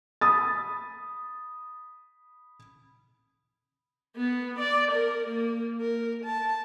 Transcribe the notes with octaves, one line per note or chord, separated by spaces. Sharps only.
B5 D#6 A6
B3
D5
A#4
A#3
A#4
A5